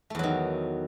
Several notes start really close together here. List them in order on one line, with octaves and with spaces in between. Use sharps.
A3 E2 F#3 D#3